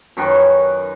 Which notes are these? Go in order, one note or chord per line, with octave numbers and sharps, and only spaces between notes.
F#2 D#3 C#4 B4